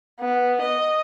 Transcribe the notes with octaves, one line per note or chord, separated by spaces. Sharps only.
B3
D#5